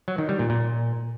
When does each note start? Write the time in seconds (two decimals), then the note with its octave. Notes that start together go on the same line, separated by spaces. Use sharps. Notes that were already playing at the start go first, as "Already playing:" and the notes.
0.08 F#3
0.18 D#3
0.29 G3
0.39 A#2
0.50 A#2